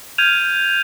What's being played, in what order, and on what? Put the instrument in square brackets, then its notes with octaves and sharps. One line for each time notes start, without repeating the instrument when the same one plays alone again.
[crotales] F6 G6 G#6 D#7 F7